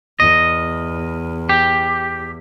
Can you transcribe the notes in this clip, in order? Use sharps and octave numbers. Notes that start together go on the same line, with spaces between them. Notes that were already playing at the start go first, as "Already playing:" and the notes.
E2 D#5
G4